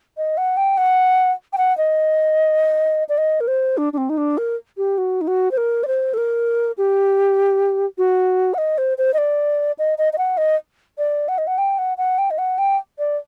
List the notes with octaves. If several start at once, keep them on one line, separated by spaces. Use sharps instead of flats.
D#5
F#5
G5
F#5
G5
F#5
D#5
D5
D#5
A#4
C5
D4
D4
C4
D#4
D4
A#4
G4
F#4
D#4
F#4
C5
A#4
D5
C5
A4
A#4
G4
F#4
F#5
D#5
C5
C5
D#5
D5
D#5
D#5
D#5
F#5
D#5
D5
F#5
D#5
F#5
G5
F#5
F#5
G5
D#5
F#5
G5
D5